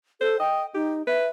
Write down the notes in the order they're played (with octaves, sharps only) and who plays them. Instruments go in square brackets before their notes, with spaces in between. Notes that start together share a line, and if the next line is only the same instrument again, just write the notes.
[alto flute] A4 [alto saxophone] C5
[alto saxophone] D#5 [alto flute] G5
[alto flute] D#4 [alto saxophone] G4
[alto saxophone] B4 [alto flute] E5